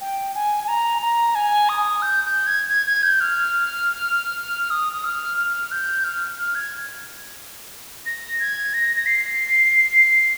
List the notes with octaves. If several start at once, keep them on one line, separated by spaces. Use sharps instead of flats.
G5
G#5
G#5
A#5
A#5
G#5
D#6
G6
G6
G#6
G#6
G#6
G6
F6
D#6
D#6
F6
F6
G6
F6
F6
G#6
A#6
G#6
A#6
A#6
C7